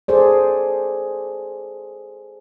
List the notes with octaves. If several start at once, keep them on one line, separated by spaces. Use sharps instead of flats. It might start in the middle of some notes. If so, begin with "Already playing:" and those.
G#4 A4 C5 D5